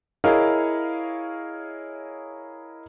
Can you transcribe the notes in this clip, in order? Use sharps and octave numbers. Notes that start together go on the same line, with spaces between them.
E4 G#4 A#4 C#5 D#5 F5